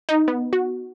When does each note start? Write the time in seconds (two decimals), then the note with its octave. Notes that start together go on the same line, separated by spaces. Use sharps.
0.09 D#4
0.28 B3
0.53 F#4